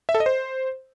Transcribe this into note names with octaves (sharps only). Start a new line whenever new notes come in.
E5
A4
D#5
C5